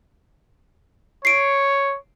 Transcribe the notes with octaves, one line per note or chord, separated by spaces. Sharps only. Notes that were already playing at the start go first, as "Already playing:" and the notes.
C#5 C7 D7